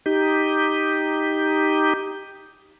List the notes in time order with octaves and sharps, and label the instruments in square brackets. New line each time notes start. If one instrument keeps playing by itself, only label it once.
[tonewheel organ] D#4 G4